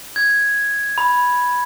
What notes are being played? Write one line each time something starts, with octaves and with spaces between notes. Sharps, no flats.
G#6
B5